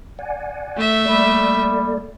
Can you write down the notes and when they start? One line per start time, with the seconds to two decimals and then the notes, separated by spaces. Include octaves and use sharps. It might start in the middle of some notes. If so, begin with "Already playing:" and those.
0.19 D5 F#5 G#5
0.77 A3 E5
1.05 G3 A#3 A4 D5